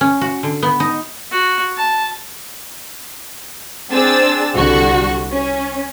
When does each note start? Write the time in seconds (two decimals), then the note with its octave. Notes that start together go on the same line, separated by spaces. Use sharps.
0.01 C#4
0.21 F#4
0.43 D3
0.62 B3
0.80 D#4
1.32 F#4
1.77 A5
3.92 C4 D4 G#4 E6 A6
4.55 C2 D3 G3 F#4 C#6
5.33 C#4